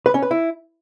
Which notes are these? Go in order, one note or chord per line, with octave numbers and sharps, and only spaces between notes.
B4
C#4
B4
E4